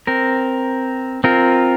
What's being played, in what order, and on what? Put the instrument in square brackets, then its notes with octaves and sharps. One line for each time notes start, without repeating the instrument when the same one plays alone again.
[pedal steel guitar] C4 A#4
C4 F4 A#4